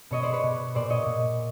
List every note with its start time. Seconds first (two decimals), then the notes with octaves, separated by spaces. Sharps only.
0.11 B2 C#5 D#5
0.23 C5 D5
0.32 B4 C#5
0.43 B2
0.75 A#2 C5 D5
0.90 C#5 D#5
1.06 A#2